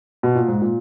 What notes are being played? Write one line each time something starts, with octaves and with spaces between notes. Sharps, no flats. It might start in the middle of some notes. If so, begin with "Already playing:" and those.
B2
A#2
G#2
A#2